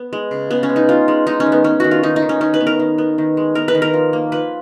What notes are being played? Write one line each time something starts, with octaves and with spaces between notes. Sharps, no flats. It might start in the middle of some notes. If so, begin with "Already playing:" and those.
Already playing: B3
G#3
C#3
C#3 B3
C#4
G#3
D#4
B3 F4
G#3
G#3 D#4
C#4
D#3
B3
B3 C#4
D#3 F#4
F4
D#3 D#4
D#4
D#3
C#4
D#3 C#4
B4
B3
A#4
D#3
B3
D#3
G#3
B3 A#4
B4
D#3
A#4
F3
A#3
F3 B4